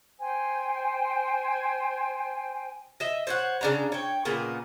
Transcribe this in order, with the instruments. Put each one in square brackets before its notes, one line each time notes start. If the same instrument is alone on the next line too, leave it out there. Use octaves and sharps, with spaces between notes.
[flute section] C5 G5 G#5
[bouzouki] D#5 E5
C5 C#5 F#5
C#3 D4 A#5
C#5 G5
A#2 C#3 A#3 B3